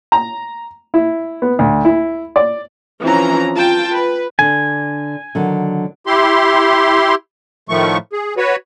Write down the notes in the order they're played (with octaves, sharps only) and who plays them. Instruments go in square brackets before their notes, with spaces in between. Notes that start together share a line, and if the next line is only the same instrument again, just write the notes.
[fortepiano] A#5
E4
B3
D2
E4
D5
[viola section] E3 F3 C4 C#4 A#5
F4 G5 A5
B4
[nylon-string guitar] D3 D4 [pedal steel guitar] G#5
[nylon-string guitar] D3 D#3 F#3
[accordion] E4 G4 C6
A2 D#3 F3 A3 C#6
G#4
F#4 B4 C#5